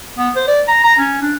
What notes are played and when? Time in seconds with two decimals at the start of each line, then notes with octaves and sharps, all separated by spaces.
0.18 B3
0.36 C5
0.48 D5
0.68 A#5
0.84 A#5
0.99 C#4
1.22 D4